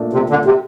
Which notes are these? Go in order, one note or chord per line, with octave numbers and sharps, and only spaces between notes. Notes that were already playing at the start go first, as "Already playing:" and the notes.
Already playing: A#2 A3 D4
C3
D3
C3